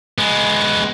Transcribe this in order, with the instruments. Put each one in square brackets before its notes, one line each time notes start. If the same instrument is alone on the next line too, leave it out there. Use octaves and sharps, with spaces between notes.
[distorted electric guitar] G#3 B3